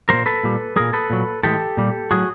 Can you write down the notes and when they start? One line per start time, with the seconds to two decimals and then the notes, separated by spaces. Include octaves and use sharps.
0.09 A#2 F#3 A#4 C5
0.26 A4 B4
0.44 A#2 G3
0.76 A#2 G3 G#4 A#4
0.93 A4 B4
1.10 A#2 F#3
1.43 A2 E3 G#3 G4 A4
1.77 A#2 G3
2.11 A2 F#3 F#4 G#4